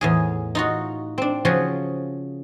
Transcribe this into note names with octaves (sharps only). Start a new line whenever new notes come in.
E2 A2 G#4
D#4 F4 F#4
C4 D4
C#3 F3 F#4 G#4